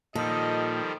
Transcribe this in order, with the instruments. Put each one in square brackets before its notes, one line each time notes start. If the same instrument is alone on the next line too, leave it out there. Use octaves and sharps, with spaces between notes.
[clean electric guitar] A#2 [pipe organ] D#3 F3 G3 [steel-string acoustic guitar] A4 [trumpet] D#5